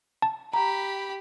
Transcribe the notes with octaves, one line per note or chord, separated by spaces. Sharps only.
A5
G4 A#5 B5